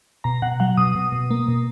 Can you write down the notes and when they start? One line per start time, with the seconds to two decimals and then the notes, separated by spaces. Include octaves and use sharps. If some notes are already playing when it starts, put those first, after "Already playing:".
0.24 B2 A#5
0.42 B2 F#5
0.60 F#3 F#5
0.77 B2 D#6
0.95 B2
1.12 B2
1.31 A#3
1.48 B2